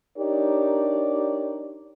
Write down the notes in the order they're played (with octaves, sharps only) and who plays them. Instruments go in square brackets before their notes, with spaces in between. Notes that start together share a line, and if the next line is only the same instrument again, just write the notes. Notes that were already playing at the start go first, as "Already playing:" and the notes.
[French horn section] D4 D#4 G4 A#4 C#5 D5